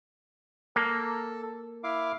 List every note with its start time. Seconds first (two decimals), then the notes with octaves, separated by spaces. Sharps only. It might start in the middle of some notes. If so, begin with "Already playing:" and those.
0.76 A#3 A4
1.84 E4 F5 D6